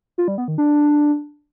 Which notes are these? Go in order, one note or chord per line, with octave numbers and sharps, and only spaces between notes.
F4
G3
B3
D#3
D4